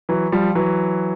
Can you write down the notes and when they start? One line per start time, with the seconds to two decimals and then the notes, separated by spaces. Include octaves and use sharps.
0.09 E3 F#3
0.32 F3 G3
0.55 E3 F#3